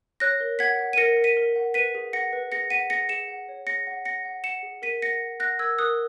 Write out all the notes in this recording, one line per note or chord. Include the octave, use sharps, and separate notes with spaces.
C#5 F#6 A#6
A#4
F#5 G#6 B6
F#5
D#7
A#4 A#6 C#7
A#4
B6 D#7
A#4
F#5
B4 B6 D#7
G#4
F#5 A#6 C#7
B4
G#4 A#6 C#7
F#5 B6 D#7
G#4 A#6 C#7
G#4 C#7 E7
F#5
C#5
G#4 A#6 C#7
F#5
F#5 A#6 C#7
F#5
F#5 C#7 E7
G#4
A#4 B6 D#7
F#5 A#6 C#7
F#5
F#5 F#6 A#6
A#4 E6 G#6
A#4 D#6 F#6